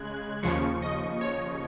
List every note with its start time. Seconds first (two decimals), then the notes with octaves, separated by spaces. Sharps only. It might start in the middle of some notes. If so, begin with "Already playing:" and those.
Already playing: C#3 G#3 F#6 G#6
0.43 D#2 C#3 F3 C#6
0.82 D#5
1.21 C#5